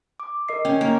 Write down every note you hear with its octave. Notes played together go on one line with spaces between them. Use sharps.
D6
A#4 D#5 C7
C#4 G5
A#3